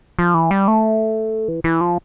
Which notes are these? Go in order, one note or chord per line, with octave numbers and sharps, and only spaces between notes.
F3
E3
G3
A3
E3
E3
F3